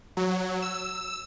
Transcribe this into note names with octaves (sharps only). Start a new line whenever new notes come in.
F#3
E6